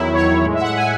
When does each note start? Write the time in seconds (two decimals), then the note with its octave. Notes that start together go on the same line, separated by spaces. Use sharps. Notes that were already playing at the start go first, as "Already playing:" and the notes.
Already playing: E2 D#3 F#3 E4
0.13 C#5
0.44 A2 G#3
0.54 E5
0.61 F#5
0.76 G#5